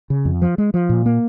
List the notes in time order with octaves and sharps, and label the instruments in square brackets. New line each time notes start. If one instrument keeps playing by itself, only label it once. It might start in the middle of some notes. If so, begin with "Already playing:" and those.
[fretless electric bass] C#3
F2
F3
G#3
F3
A#2
A#3